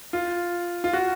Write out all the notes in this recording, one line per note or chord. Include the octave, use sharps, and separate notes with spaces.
F4
F4
F#4